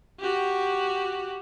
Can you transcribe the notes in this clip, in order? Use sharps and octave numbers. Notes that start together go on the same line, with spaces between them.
F#4 G4